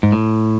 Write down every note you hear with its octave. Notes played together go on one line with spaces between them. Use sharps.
G#2
A2